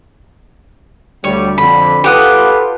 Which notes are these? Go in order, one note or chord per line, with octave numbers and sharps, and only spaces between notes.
D2 G3 C#5
F2 D3 B5
F4 G4 A4 B4 F#5 D#6